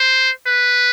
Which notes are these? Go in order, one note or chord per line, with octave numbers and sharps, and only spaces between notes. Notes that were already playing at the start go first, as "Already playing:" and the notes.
Already playing: C5
B4